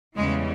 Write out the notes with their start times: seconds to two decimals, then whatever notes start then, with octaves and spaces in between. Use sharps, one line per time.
0.17 E2 C#3 E3 G3 G#3